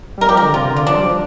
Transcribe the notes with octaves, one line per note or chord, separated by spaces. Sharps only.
G3 A#4
F3 G4
A#4
D3
C3 F4
D3
F4
F3 D4
G3
F3